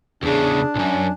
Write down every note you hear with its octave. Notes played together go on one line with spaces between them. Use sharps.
E2 C#3 D4 G#4
B1 F#2 G#5